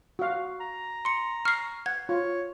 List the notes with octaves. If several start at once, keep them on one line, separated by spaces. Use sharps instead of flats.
F#4 F5
A#5
C6 C#7
C#6 F6 C7
F#5 G#6
F4 C#5